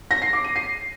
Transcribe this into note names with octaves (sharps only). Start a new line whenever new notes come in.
A#6
C7
D6
D#7
C7